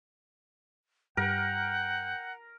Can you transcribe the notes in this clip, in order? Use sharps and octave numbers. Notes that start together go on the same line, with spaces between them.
G2 A#4 F#5 G5